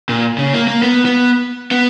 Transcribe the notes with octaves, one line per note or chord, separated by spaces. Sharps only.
A#2
C#3
A#3
A#3
B3
B3
B3